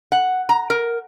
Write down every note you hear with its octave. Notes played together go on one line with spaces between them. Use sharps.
F#5
A#5
A#4